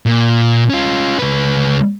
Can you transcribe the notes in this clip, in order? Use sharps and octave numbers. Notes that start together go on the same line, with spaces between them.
A#2
C#4 F4
C#2 B4